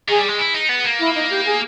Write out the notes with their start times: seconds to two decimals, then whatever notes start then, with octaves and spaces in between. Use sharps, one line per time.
0.08 D#3 G#4
0.18 G3
0.28 G#3
0.38 E4
0.54 D#4
0.69 B3
0.85 A#3
0.99 E4
1.15 D#4
1.30 G4
1.45 G#4